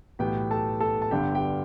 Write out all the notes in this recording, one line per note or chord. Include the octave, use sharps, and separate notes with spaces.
B1 A2 E3 B3 G4 G5
A4 A5
A4 A5
A5
G1 G2 D3 G4 G5
G4 G5